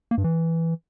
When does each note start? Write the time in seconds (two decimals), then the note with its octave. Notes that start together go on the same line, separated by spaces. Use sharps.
0.11 A#3
0.18 G2
0.24 E3